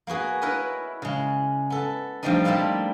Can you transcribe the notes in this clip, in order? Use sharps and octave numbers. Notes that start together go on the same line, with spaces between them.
A#3 B3 F#4 G#4
E4 A#4 B4 C#5 D#5
C#3 G#3
B3 A4
F3 G3 A3 C4 D4 D#4
G3 A3 A#3 E4 F4 A4